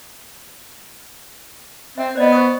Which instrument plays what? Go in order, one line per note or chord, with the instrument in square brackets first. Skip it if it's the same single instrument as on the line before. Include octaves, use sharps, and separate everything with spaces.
[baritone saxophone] C4 [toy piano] E5
[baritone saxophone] B3 [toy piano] C5 D5 D#5
[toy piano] C5 C#6 D#6